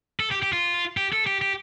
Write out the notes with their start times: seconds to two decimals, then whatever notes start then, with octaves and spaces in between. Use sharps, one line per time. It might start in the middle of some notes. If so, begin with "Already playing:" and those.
0.20 A4
0.31 G4
0.42 G4
0.53 F4
0.97 G4
1.13 A4
1.27 G4
1.41 G4